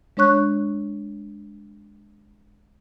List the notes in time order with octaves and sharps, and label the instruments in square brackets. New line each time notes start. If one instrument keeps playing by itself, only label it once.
[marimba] G#3 D4 C#5 C#6 F#6